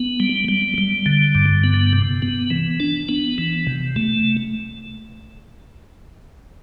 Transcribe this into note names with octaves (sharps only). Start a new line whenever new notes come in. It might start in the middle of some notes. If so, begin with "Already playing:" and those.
Already playing: B3
G3
G3
G3
D3
G2
B3
C3
B3
E3
D4
B3
E3
C3
A3